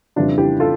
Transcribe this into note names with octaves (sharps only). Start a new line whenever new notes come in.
F2 C#3 E3 G3 D4 F4
E4 G4
F4 A4